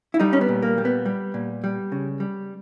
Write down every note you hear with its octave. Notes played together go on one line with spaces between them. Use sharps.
E4
G3 D#4
C#4
B3
A#2
A#3
G3
B3
G3
A#2
G3
C#3
G3